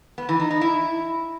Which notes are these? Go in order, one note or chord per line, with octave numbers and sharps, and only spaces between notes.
B3
E3
D#4
D#4
E4